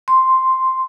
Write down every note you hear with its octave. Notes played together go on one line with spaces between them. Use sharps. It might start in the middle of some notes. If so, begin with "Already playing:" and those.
C6